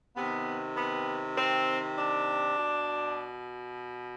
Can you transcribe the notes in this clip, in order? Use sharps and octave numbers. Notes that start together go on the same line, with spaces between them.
C3 D#3 B3
B3
C4
D4
B2